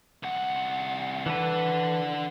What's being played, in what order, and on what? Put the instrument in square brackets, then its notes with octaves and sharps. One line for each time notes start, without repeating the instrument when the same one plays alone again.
[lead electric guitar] C2 F#5
[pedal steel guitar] E3 A4 B4 [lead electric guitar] D4 F#5